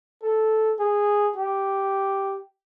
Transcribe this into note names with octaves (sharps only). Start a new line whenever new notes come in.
A4
G#4
G4